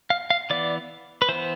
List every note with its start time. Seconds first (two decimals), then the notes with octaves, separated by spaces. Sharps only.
0.10 F5
0.30 F5
0.50 E3 B3 D5
1.22 B4
1.29 E3 B3 C5